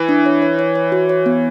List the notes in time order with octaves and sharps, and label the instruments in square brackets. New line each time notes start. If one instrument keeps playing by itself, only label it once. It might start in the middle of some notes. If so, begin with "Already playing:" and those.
Already playing: [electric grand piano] E3
[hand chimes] D4
C#5
C#5
C#5
C#5
F#4
C#5
B3